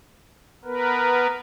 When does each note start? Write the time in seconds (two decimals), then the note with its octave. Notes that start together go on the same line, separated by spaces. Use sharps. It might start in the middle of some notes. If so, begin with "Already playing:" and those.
0.65 B3 A#4 B4